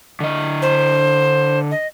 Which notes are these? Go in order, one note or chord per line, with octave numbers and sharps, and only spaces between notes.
D3 D#5
C5
D#5